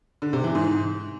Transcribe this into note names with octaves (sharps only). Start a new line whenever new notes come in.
D3
C3
E3
G#2